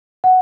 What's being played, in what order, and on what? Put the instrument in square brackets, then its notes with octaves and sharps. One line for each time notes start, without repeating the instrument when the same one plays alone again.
[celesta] F#5